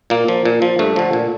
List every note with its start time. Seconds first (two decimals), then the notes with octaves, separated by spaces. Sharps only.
0.10 A#2 A#3
0.28 F3
0.45 A#2
0.62 F3
0.79 G2 A3
0.96 D3 F3
1.13 A#2